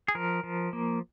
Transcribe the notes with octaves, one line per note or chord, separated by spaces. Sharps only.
G#4
F3 A#4
F3
A#3